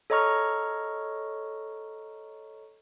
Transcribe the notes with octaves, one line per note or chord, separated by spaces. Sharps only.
A4 C#5 D#5 A#5 C#6 F6